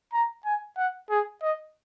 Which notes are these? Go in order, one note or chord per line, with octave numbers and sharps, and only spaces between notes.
A#5
G#5
F#5
G#4
D#5